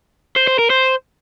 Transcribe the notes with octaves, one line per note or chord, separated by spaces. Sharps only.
C5
C5
A#4
C5